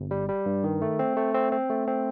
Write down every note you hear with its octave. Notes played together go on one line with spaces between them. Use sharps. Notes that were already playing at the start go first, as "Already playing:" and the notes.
Already playing: G1
G3
G3
G2
D#3
A3
C4
A3
C4
C4
A3
C4